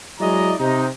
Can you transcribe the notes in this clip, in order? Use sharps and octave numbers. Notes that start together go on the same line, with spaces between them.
F#3 G#3 E4 D5 D#5 A#5
C3 D#4